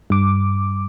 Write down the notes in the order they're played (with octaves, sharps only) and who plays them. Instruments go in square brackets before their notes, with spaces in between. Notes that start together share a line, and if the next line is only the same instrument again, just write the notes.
[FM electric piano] G2 D6